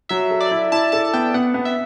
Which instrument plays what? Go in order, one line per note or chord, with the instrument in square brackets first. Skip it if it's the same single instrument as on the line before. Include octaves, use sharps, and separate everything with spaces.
[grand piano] F#3 [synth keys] E5
[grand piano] A4
[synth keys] D5
[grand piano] E4
[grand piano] E4 [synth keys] A5
[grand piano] A4 [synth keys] A5
[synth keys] A5
[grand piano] B3 [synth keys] G5
[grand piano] B3 [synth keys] F#5
[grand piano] B3
[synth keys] E5